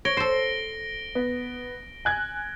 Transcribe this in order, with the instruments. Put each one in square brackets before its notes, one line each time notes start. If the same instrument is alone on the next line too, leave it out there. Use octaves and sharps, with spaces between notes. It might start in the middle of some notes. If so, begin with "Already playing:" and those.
[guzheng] C#5 [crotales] A#6 D7 G7
[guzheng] A4 C5 [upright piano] C7
[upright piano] B3
G#5 F#6 G#6